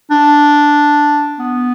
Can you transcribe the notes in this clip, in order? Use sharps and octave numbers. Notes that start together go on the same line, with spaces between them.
D4
B3